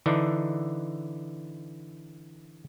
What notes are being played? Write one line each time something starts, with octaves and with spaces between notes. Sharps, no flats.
D3 E3 D4 D#4